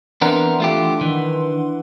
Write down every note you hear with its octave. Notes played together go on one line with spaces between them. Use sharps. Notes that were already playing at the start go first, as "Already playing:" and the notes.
E3 B3 C4 D4 A#4 F#5 C6
A3 F4 G4
D#3 E3 B4